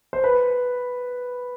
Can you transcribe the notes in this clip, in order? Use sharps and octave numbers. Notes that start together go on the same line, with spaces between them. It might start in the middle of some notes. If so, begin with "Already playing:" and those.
C5
B4